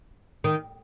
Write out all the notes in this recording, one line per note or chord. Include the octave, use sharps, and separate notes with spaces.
D#3